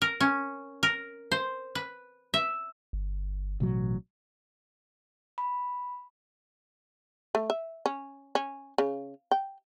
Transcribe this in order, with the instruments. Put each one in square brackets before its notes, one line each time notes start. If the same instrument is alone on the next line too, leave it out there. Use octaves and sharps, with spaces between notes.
[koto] A#4
C#4
A#4
C5
B4
E5
[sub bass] G1
[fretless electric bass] A1 F#3 [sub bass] B2
[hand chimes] B5
[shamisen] A3
E5
C#4
C#4
C#3
G5